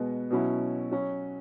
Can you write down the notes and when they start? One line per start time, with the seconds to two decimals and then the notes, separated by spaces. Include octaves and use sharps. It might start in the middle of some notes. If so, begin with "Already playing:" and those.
Already playing: B2 G#3 B3
0.31 B2 F#3 C#4 E4
0.91 F#3 C#4 F#4